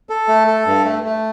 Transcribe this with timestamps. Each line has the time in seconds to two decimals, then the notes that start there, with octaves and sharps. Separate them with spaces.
0.09 A4
0.28 A3
0.47 A4
0.66 G2
0.85 A3
1.04 A3